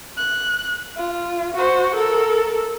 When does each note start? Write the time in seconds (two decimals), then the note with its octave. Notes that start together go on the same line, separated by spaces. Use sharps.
0.17 F#6
0.97 F4
1.55 F#4 C5
1.96 A4 A#4